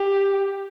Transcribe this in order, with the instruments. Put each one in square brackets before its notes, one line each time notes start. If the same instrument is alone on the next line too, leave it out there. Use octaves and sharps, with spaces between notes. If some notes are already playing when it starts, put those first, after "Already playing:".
Already playing: [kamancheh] G4